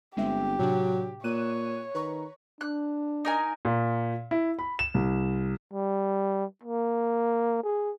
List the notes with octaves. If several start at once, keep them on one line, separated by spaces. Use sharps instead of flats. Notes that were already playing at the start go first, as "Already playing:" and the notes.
G1 G#3 C4 G4 E5
A2 C3 F#3 D4
A#2 C#5 F#6 D#7 E7
D#3 B4 A#5 C#6
D4 F#6
D#4 A#4 G#5
A#2
E4
B5
E7
C2
G3
A#3
G#4